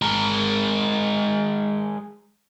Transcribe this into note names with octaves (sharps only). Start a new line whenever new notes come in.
G#3 A#4